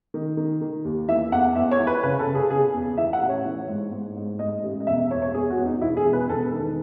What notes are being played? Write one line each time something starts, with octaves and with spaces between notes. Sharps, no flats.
D#3
D#3
D#3
D#2
E3 E5
E2 F#5
E2 E5
C#5
E3
B4
C#3 B4
A4
C#3
G#4
C#3 G#4
E2
E3 E5
F#5
A1
C#5
E3
G#2
G#2
G#2
G#2 D#5
A1
D#5
E1 E5
E5
E2 C#5
C#5
E2 G#4
F#4
E2
D#4
E1 E4
G#4
E1
B4
E1 A4
D#3